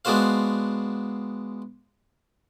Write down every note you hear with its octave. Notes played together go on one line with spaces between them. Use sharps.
G#3 B3 D4 F#4 C5 F5